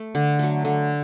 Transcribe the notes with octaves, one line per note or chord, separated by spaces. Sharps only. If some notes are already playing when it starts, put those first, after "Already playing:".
Already playing: A3
D3
F#3 A3
D3